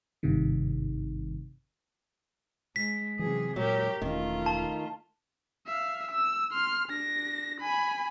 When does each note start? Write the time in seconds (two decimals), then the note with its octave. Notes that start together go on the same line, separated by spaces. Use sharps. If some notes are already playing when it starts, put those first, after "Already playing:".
0.23 G#1 G2 C3 D#3
2.76 G#3 B6
3.19 C3 E3 F#3 G#4
3.56 A#2 F#3 G#3 G4 A#4
4.02 E1 D#3 A3 C#4 F4
4.46 A5
5.67 E5 F5
6.12 E6
6.52 C6 F6
6.88 D4 A#6
7.61 G#5 B5